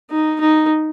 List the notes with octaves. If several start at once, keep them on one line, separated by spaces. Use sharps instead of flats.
D#4
D#4